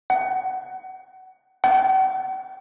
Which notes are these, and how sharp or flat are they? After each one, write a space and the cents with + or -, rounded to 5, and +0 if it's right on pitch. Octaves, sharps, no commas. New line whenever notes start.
F#5 +25
F#5 +45